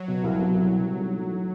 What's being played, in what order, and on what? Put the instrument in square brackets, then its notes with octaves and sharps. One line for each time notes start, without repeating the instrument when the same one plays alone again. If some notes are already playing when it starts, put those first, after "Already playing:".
Already playing: [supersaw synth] F#3
[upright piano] B2
C2
C2
C2
B2
G3
B1
A2
E3